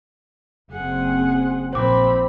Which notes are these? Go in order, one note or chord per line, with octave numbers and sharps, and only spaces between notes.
F#1 C4 G#4 F#5
A#1 A#3 C4 C5 B5 D6